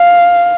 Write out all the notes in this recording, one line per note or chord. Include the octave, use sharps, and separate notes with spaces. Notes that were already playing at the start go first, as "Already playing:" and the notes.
Already playing: F5